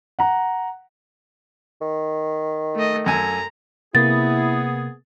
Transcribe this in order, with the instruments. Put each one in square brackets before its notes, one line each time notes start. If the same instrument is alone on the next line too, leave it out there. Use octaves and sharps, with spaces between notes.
[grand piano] F#5 A#5
[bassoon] D#3
[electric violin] A3 D#5
[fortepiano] F#2 A4 G#5 [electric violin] A#5
[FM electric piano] C3 A#3 [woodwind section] B3 G#4 [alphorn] E4 [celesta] A6